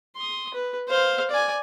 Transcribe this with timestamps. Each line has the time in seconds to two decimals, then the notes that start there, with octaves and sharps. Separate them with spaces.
0.16 C6 D#6
0.54 B4
0.88 C5 F5
1.30 D5 G#5